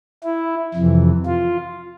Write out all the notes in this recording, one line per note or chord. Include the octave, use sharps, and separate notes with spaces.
E4
F2 C3 E3
F4